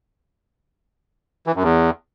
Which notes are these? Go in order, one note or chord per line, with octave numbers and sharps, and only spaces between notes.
E3
F#2
E2